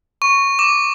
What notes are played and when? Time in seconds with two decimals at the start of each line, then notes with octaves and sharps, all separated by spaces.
0.22 C#6
0.59 D6